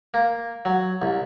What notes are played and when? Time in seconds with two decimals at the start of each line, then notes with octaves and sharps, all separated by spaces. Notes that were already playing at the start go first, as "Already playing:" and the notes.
0.14 A#3
0.65 F#3
1.02 C2